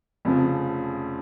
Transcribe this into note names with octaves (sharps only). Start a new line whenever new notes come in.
F1 F2 C#3 F3